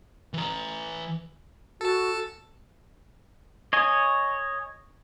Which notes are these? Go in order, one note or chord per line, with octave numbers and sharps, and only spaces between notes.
E3 A#5
F#4 A4 A5
C#5 D#5 G#5